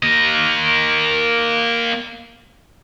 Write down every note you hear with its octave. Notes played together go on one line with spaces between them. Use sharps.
A#3 D#5